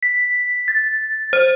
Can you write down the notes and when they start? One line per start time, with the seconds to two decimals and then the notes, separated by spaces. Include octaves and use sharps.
0.03 B6
0.68 A6
1.33 C5